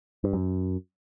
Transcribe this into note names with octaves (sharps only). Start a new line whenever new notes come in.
G2
F#2